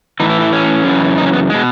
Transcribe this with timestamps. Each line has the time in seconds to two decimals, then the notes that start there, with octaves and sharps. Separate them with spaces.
0.20 A2 E3 D#4
0.30 E4
0.41 E4
0.52 C#4
0.84 F#2 C#3 E3
1.18 D#4
1.26 C#4
1.33 B3
1.50 B2 G#3